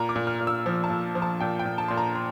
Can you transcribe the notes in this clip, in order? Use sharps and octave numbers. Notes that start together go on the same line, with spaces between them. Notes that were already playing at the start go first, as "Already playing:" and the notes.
Already playing: A#2 A#5
D6
A#2
F6
A#2
E6
F3
A5
A#2
F3
A5
A#2 G5
G5
A#2
A5
A#2 C6
A#5
C6